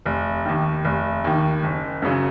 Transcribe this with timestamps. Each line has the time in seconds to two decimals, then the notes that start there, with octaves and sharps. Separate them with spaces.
0.06 F1
0.45 D#2 D#3
0.84 F1
1.24 D#2 D#3
1.63 F#1
2.02 F#2 C#3 F#3